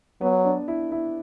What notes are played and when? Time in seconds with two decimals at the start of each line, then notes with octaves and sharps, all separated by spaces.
0.21 F#3 B3
0.45 D4
0.68 E4
0.92 E4